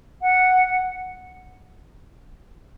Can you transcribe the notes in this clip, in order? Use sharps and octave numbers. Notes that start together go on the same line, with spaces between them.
F#5